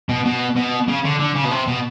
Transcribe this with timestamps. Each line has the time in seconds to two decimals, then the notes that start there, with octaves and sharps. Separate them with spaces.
0.09 B2
0.25 B2
0.56 B2
0.88 C#3
1.05 D3
1.20 D3
1.35 C#3
1.45 B2
1.51 C3
1.68 B2